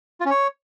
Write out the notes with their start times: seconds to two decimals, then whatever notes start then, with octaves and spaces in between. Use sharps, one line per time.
0.20 F4
0.25 C#4
0.30 C#5